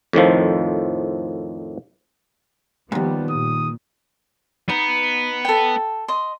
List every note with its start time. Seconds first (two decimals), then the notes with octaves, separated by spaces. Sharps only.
0.13 F2 A2 D#3 F3
2.92 D#2 G#2 F3 G3 B3
3.30 A#2 D#6
4.69 B3 D#4
5.45 A4 G5
6.08 D#5 C6